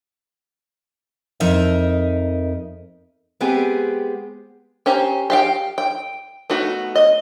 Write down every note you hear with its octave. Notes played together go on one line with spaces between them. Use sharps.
F2 D#4 A#4 E5
G#3 B3 C4 G4 G#4
C#4 G4 C5 A#5
G4 F5 G5
G5
A3 B3 D#4 F#4
D#5